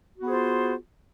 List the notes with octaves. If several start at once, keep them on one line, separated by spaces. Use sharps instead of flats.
B3 F4 F#4 G#4 C5